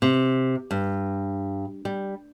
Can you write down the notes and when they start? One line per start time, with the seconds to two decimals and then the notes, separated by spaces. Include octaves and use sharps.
0.02 C3
0.71 G2
1.85 G3